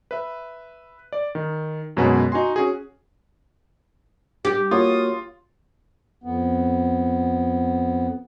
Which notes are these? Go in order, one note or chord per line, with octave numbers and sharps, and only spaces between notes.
B4 E5
D5
D#3
F#2 B2 G#3 C#4 B4 F#5
D#4 F#4 G#5 C6
C#4 F#4 G#4
G4
A#3 F4 F#4 C#5 D#6
F2 B3